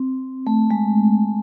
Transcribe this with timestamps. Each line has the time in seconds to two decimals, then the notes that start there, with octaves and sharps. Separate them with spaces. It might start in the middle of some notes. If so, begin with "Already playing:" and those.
Already playing: C4
0.47 A3
0.71 G#3